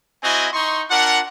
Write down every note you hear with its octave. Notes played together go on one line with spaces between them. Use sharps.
C4 E4 F#4 D#5 G#5
D#4 C6 C#6
D4 F4 A#4 F#5